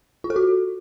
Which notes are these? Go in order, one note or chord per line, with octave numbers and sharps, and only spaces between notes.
F4
A4
F#4